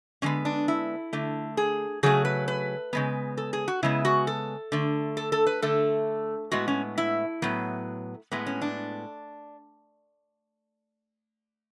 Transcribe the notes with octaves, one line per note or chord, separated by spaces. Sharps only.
D3 G#3 B3 C#4
D4
E4
D3 A3
G#4
C#3 F#3 A3 G#4
B4
B4
C#3 G#3 B3
A4
G#4
F#4
C#3 G#3 B3 E4
F#4
A4
D3 A3
A4
A4
B4
D3 A3 A4
A2 G#3 B3 F#4
C#4
E4
A2 F#3 B3
A2 G#3 B3
C#4
D4